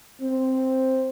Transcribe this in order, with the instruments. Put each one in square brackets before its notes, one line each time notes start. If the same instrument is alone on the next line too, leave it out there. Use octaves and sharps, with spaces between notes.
[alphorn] C4